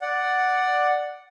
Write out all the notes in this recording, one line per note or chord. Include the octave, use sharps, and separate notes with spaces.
D5 F#5